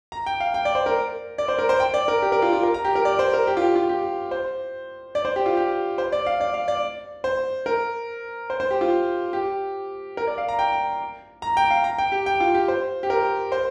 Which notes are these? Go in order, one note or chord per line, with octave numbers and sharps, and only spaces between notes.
A#5
G5
F5
G5
D5
C5
A#4
D5
C5
A#4
C5
G5
D5
A#4
G4
A#4
F4
F4
A#4
A#5
G4
A#4
D5
C5
A#4
G4
F4
G4
F4
G4
C5
D5
C5
G4
F4
G4
C5
D5
F5
D5
F5
D5
C5
A#4
C5
C5
G4
F4
G4
A#4
D5
F5
A#5
G5
A#5
G5
F5
A#5
G5
G4
G5
F4
G4
C5
G4
A#4
C5